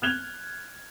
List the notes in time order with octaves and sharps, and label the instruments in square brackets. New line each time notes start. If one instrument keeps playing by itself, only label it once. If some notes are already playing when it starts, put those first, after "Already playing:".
[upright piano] F6 F#6 G#6 F7 G7